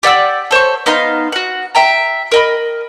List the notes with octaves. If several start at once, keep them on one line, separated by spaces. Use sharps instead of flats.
G4 D5 F#5 E6
A4 C5 C#5 C#6
B3 D#4 F5 C6
F#4 F#5
E5 G5 A#5
A#4 D#5 B5